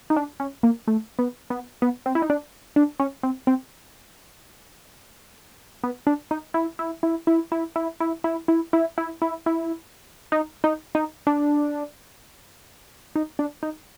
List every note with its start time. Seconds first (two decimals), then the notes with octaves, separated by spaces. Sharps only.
0.10 D#4
0.16 D4
0.40 C#4
0.63 A#3
0.87 A3
1.19 B3
1.50 B3
1.82 B3
2.06 C4
2.15 E4
2.22 D#4
2.30 D4
2.76 D4
3.00 C#4
3.23 C4
3.47 C4
5.84 B3
6.07 D4
6.31 D#4
6.54 E4
6.79 E4
7.03 E4
7.27 E4
7.52 E4
7.76 E4
8.00 E4
8.24 E4
8.48 E4
8.73 E4
8.98 E4
9.22 E4
9.46 E4
10.32 D#4
10.64 D#4
10.95 D#4
11.27 D4
13.16 D#4
13.39 D4
13.63 D#4